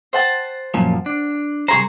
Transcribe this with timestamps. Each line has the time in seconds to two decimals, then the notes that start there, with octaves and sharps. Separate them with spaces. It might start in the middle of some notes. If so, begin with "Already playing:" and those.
0.13 C5 F#5 A5
0.74 F#2 A#2 F3
1.06 D4
1.68 C2 G#4 C5 A#5 C6 C#6